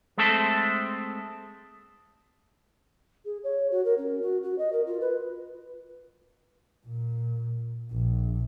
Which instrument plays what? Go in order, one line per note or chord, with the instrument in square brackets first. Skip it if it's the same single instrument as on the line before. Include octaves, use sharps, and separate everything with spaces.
[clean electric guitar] G#3 A3 C4 A4
[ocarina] G#4
C#5
F#4
A#4
C#4
F#4
F#4
D#5
A#4
F4
B4
[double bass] A#2
A#1